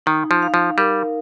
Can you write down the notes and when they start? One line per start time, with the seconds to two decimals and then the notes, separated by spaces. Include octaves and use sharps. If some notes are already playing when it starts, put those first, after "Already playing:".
0.06 D#3 D#4
0.31 F3
0.42 F5
0.54 F3
0.77 G3 A#4